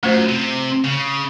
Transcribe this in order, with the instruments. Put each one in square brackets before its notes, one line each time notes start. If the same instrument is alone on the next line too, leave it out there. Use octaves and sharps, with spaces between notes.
[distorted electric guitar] F#2 [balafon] A3 F4 C5
[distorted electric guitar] C3
C#3